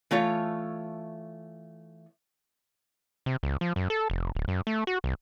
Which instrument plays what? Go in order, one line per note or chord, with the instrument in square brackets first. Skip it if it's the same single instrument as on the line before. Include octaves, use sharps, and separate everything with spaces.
[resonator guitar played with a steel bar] E3 A3 F4 C#5
[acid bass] C3
C#2
F3
F#2
A4
F1
D1
F#2
A3
F#4
C2